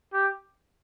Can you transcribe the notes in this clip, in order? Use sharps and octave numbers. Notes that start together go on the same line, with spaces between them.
G4